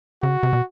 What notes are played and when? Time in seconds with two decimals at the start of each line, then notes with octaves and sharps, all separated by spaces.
0.23 C#3 F#4
0.43 C3
0.53 B2